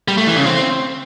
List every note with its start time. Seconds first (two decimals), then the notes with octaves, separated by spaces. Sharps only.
0.08 G3
0.18 A3
0.27 E3
0.37 C#3
0.46 C4